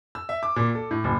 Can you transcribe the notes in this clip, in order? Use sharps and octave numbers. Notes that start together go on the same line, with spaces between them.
E6
E5
D6
A#2
A4
A2
F#1